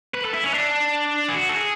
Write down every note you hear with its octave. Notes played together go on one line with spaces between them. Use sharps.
B4
A4
E4
C#4
D4
G#4
F#4
A4
G#4